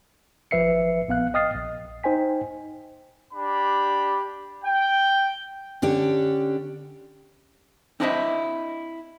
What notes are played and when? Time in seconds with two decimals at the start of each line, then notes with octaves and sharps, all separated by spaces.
0.51 G#1 F3 B4 E5 C7 C#7
1.08 A#1 B3 F5 F#6
1.34 D#5 G5 D#6 F6 A6 C7
1.54 A#1
2.04 D#4 C5 G5 G#5 B6
3.33 D4 G4 B5
4.64 G5
5.82 D3 C#4 D4 G4
8.00 C4 D4 E4 C5 D#5 E5